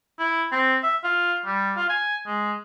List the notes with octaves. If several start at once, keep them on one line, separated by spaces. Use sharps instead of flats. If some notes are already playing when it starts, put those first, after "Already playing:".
E4
C4
E5
F4
G3
F4
G#5
G#3